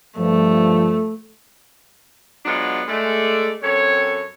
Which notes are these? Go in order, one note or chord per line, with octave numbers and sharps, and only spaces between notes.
G2 F3 A3
F#3 G#3 B3 D4 F4
G#3 A3 D5
F#2 C4 A4 C#5